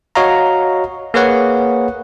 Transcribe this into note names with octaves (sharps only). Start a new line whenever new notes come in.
F#4 C#5 D#5 F5 A#5
A#3 G#4 B4 C#5 F#5